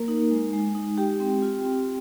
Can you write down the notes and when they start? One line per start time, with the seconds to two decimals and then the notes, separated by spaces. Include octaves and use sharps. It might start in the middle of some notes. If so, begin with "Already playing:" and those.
Already playing: A#3 A#4
0.08 D#4
0.31 G#3
0.53 G#3
0.75 D#4
0.97 G#3 G4 G5
1.20 C4
1.42 F4
1.65 C4